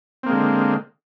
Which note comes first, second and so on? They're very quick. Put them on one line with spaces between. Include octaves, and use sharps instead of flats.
C4 A#3 G#3 D3